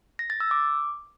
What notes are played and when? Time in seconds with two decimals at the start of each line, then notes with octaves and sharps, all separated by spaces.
0.19 A#6
0.30 A6
0.40 E6
0.51 D6